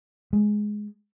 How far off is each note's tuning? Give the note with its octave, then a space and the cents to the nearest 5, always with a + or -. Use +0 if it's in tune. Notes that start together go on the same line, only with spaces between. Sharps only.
G#3 +10